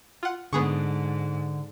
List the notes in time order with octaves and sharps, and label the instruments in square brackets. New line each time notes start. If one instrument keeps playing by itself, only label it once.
[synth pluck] F4 F#5
[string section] G#2 [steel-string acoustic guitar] D3 [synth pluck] B3 G#4 C#6